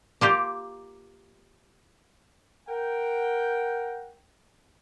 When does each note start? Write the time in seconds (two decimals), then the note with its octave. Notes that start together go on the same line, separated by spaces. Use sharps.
0.21 A#3 F4 G4
2.68 A#4 F#5 G5